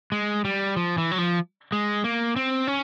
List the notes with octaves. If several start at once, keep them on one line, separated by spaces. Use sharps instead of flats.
G#3
G3
F3
E3
F#3
F3
G#3
A#3
C4
C#4